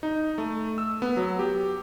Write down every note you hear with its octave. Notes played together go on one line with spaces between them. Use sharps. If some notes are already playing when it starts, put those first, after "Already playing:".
D#4
A3
E6
B3
F#3
G4